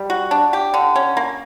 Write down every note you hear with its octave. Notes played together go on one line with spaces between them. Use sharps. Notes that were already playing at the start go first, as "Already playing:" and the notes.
Already playing: G3
F#4
D4
G4
D3
C#4
A#3